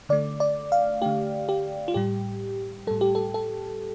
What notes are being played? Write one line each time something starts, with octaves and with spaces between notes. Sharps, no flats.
D3 A3 D5
D5
F5
D3 A3 G4
G4
F4
A2 G3 G4
A2 G3 A4
G4
A4
A4